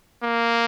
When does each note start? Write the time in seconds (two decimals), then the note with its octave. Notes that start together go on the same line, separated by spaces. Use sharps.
0.23 A#3